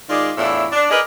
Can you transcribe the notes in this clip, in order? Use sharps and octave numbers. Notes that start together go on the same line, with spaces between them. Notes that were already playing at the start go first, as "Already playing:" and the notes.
D#3 G#3 F4 D5
E2 A2 D4 E4 F4 E5
D4
G#4 A#4 B4 D5 D#5